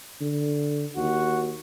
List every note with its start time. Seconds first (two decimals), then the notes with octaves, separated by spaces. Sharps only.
0.21 D3
0.97 D#2 F#4